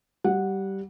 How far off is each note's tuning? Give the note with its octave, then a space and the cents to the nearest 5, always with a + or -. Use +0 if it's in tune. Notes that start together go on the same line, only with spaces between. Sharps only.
G3 -15 F#5 -10